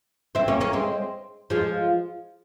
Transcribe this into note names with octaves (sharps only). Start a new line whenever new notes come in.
C4 E4
A#3 C#4
A#3 C#4
G#3 C4
F3 G#3